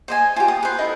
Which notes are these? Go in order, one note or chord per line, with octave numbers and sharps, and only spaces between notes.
C5 D#5 G#5
F4 G4 G#5
D#6
B4 C5
B3 E4 A4 D#5